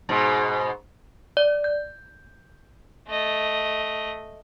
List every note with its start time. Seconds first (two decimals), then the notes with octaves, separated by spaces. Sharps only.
0.09 G#2 B2
1.37 D5
1.64 G6
3.09 A3 D#5